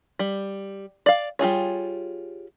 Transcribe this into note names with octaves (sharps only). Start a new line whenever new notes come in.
G3
D5 F5
G3 F4 G#4 C#5